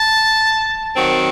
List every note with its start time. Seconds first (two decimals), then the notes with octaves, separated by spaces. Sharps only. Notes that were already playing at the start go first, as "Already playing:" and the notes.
Already playing: A5
0.94 D#3 F#3 C4